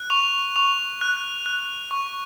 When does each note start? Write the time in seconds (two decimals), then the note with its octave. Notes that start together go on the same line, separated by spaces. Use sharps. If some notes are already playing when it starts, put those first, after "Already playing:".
Already playing: F#6
0.10 C#6 F7
0.56 C#6 F7
1.01 F#6
1.46 F#6
1.91 C#6